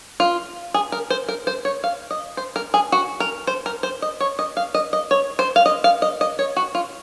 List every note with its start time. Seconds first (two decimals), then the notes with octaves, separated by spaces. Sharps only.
0.20 F4
0.74 G#4
0.92 A#4
1.10 C5
1.29 A#4
1.47 C5
1.65 C#5
1.84 F5
2.11 D#5
2.37 C5
2.56 A#4
2.74 G#4
2.92 F#4
3.20 A#4
3.47 C5
3.66 A#4
3.83 C5
4.02 D#5
4.20 C#5
4.39 D#5
4.57 F5
4.75 D#5
4.93 D#5
5.11 C#5
5.39 C5
5.56 F5
5.66 D#5
5.84 F5
6.02 D#5
6.21 D#5
6.39 C#5
6.57 F#4
6.75 F4